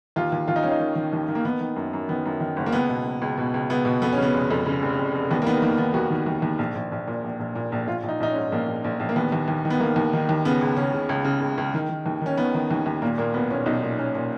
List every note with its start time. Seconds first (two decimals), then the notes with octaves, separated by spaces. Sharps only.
0.16 D#2 F4
0.32 D#2
0.48 D#2 F4
0.56 D#4
0.63 D#3 C#4
0.71 D#4
0.80 D#3
0.96 D#3
1.13 D#2
1.28 D#3
1.35 A#3
1.45 D#3 B3
1.61 D#3
1.76 F#2
1.93 F#2
2.09 D#3 B3
2.25 F#2
2.40 D#3
2.57 F#1
2.66 A#3
2.72 C#2 B3
2.89 B2
3.05 C#2
3.22 C#2
3.38 B2
3.54 C#2
3.70 C#2 B3
3.85 B2
4.02 F2 B3
4.12 C#4
4.18 C#3 B3
4.34 F1
4.50 F2
4.66 C#3
4.82 F1
4.99 F1
5.15 F1
5.31 D#2 B3
5.42 A#3
5.47 D#3 B3
5.62 D#3 A#3
5.78 D#3 B3
5.94 D#2 F#4
6.10 D#3
6.26 D#2
6.42 D#2
6.59 A#1
6.75 A#1
6.92 A#1
7.07 A#2
7.24 A#1
7.40 A#1
7.55 A#2
7.72 A#1
7.87 A#1 F4
8.03 A#1
8.09 D#4
8.20 A#1 D#4
8.30 C#4
8.36 G#2
8.52 A#1 A#3
8.67 A#1
8.84 A#1
9.00 A#1
9.09 A#3
9.16 D#2 B3
9.32 D#2
9.48 D#2
9.65 D#3
9.70 B3
9.80 D#3 A#3
9.96 D#2
10.13 D#3
10.29 D#2
10.45 C#3 B3
10.61 C#2
10.77 C#3 C#4
10.93 C#3
11.09 C#2
11.25 C#3
11.41 C#2
11.58 C#2
11.74 D#3
11.89 D#3
12.06 D#2
12.22 D#3 C#4
12.37 D#3 B3
12.54 D#3
12.71 D#2
12.86 D#2
13.02 A#2 A#3
13.18 A#2 A#3
13.34 B1 B3
13.50 A#2 C#4
13.66 B1 D#4
13.83 A#2
13.99 A#2 C#4
14.15 A#2